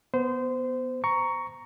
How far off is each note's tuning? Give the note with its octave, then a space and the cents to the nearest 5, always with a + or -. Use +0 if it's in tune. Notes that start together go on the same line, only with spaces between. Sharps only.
B3 +0 C5 -25
A#5 +0 C#6 +15